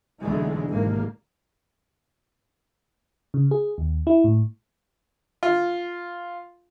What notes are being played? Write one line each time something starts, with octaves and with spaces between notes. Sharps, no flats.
B1 D3 E3 G#3 A3
G#1 C3 A#3
C#3
G#4
D#2
E4
A2
F4